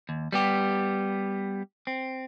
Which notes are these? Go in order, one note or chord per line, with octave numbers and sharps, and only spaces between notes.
D#2
G3 B3 G4
C4